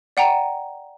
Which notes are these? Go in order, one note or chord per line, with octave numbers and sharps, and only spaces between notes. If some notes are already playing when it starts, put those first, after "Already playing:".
D5 F#5 G5 A#5